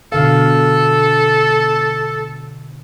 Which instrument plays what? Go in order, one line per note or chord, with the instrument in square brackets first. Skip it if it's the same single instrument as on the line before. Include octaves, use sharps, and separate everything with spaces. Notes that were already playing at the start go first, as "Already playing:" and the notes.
[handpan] B2 D3 F5 [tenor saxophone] A4